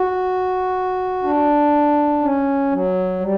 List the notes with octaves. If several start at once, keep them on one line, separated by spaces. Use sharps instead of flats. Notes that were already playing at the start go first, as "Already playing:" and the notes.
Already playing: F#4
D4
C#4
F#3
G3